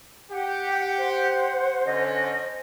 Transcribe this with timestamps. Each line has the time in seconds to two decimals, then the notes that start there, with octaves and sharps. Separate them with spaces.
0.32 G4 F#5
0.98 C5
1.86 D3 C#4 D#5